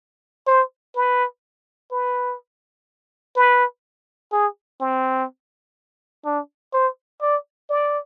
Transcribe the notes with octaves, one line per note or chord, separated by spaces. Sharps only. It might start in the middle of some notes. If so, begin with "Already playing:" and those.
C5
B4
B4
B4
G#4
C4
D4
C5
D5
D5